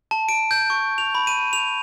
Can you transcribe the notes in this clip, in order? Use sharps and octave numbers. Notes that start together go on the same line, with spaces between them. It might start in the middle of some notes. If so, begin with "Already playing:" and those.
A5
D7
G6
C#6
F7
B5
D#7
F7